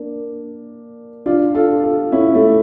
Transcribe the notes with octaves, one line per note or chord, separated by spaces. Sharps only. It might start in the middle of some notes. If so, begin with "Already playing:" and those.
Already playing: A#3 D4
D4 F4
F4 A4
F4 A4
C#4 E4
A3 C#4